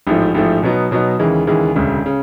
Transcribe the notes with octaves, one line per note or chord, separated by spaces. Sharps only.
A1 G#2 F3 A3
A1 G#2 F3 A3
B2 F#3 B3 D#4
B2 F#3 B3 D#4
D#2 C#3 E3 G#3
D#2 C#3 E3 G#3
E1 D2 C#3
C#3